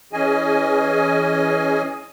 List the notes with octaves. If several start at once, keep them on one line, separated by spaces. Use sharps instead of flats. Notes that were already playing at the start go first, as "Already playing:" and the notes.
E3 C#4 G#4 D#5 G#5